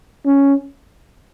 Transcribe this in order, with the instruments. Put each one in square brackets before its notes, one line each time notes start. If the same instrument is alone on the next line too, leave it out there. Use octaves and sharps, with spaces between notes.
[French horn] C#4